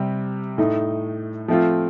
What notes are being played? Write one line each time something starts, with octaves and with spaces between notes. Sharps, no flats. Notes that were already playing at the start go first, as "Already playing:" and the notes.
Already playing: C3 G3 C4
A2 A3 D#4
F3 A3 C4 F4